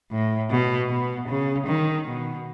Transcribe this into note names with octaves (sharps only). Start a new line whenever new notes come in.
A2
B2
B2
C#3
D#3
B2